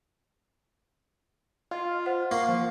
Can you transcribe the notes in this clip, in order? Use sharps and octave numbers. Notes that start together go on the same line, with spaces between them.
F4 D#5
C5 F#5
A#3 C#6 C7
F3